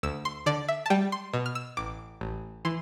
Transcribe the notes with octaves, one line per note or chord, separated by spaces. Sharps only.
D2 E6
C6
D3 D5
E5
A5
G3 G5
C6
B2
F6
E6
A1 D6
A1
E3 C6